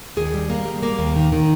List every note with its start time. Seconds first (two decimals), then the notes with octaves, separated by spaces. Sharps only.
0.17 D#2 G#4
0.34 G3
0.50 A#3
0.66 G3
0.83 A#3
0.99 D#2
1.16 D#3
1.32 D#3